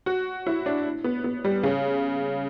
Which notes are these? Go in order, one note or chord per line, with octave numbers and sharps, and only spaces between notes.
F#4
E4
D4
B3
B3
G3
C#3